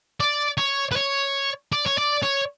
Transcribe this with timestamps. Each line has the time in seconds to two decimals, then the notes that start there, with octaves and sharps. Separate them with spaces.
0.20 D5
0.58 C#5
0.92 B4
0.96 C#5
1.72 D5
1.86 C#5
1.98 D5
2.23 C#5